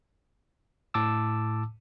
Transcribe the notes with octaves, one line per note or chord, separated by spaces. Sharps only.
A2 A5 D6 E6